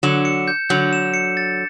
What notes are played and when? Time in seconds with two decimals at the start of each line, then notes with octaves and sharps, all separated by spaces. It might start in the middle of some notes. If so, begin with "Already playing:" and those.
0.03 D3 F#3 E7
0.25 C#7
0.48 G6
0.69 D3 F#3 G6
0.93 E7
1.14 C#7
1.37 A6